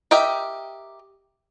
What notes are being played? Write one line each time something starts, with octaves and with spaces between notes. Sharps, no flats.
G4 A#4 D#5 E5 G5